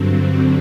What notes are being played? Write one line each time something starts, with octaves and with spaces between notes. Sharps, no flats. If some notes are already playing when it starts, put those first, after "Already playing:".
Already playing: G2 D3 F#3 C4